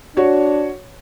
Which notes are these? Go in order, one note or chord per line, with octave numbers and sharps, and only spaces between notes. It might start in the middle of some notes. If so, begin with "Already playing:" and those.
D4 F#4 C#5